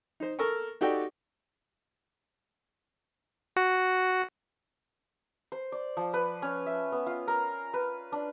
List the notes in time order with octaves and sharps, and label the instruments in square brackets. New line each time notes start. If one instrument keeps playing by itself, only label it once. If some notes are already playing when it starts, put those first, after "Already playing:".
[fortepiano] D#4 C5
A4 A#4 A#5 C#6
D#4 F#4 G4 A4 D5 G5
[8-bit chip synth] F#4
[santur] C5
D5
F3
B4
C#4
E5
B3
F4
A#4
B4
D4